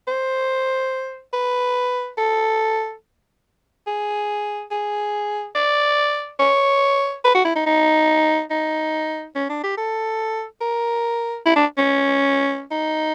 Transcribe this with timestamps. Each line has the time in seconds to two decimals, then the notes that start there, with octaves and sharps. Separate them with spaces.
0.08 C5
1.33 B4
2.18 A4
3.87 G#4
4.71 G#4
5.55 D5
6.39 C#5
7.25 B4
7.35 F#4
7.45 E4
7.55 D#4
7.66 D#4
8.50 D#4
9.35 C#4
9.49 D4
9.63 G4
9.77 A4
10.61 A#4
11.46 E4
11.56 D4
11.78 C#4
12.71 D#4